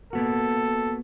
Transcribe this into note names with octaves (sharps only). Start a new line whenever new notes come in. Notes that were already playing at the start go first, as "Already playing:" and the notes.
A#3 B3 F#4 A4